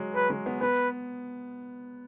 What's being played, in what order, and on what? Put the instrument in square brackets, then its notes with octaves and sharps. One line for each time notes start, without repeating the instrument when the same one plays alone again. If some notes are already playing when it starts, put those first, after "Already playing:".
Already playing: [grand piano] F#3 G#3
[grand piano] F#3 [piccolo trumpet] B4
[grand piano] G#3
B3
[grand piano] B3 [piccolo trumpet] B4